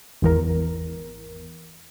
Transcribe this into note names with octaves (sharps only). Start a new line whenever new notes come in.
G#1 E2 A#4